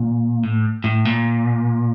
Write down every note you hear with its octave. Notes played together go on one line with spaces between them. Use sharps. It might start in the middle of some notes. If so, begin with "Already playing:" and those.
Already playing: A#2
A2
A2
A#2